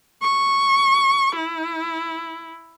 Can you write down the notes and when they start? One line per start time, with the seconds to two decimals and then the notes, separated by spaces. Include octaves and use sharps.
0.22 C#6
1.36 E4